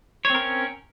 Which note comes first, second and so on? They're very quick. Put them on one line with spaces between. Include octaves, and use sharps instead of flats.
C#5 C4 A#4 C#4